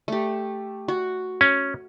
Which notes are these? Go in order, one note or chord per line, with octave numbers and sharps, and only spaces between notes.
A3 G4
F#4
C#4